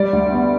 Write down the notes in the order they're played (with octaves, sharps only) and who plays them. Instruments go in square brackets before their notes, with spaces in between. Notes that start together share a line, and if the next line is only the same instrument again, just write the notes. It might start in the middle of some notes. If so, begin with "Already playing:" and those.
Already playing: [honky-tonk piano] G3 D5
D2
B3